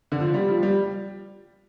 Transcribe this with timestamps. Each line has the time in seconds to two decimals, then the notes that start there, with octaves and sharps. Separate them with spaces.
0.12 D3
0.20 F3
0.34 G3
0.48 F3
0.63 G3